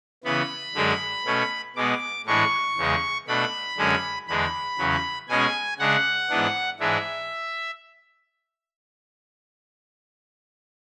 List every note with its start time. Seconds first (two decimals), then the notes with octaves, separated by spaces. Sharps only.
0.24 C#3 E3 B3 B5
0.75 F#2 D3 G#3 D4
1.25 B2 A3 C#4
1.76 B2 G#3 B3 D6
2.26 A2 E3 G#3 D4 C#6
2.77 E2 C#3 G#3
3.27 B2 A3 D4 B5
3.78 F#2 D3 G#3 C#4
4.28 E2 D3 G#3 D4 B5
4.78 E2 C#3 F#3
5.28 B2 G#3 C#4 G#5
5.79 C#3 G#3 D4 F#5
6.30 G#2 E3 B3 D4
6.79 G#2 E3 G#3 D4 E5